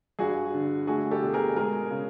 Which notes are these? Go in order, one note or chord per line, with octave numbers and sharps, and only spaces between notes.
G2 F#4 G#4
D3
A3 F#4 G#4
G4 A4
B2
G#4 A#4
G#3 G#4 A#4
C#3